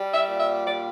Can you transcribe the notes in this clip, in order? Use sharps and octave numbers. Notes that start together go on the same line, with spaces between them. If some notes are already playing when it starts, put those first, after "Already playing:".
Already playing: G3
E5
A#2
E5
G3 D5